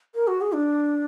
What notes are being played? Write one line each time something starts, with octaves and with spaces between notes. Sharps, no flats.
A#4
F#4
G#4
D4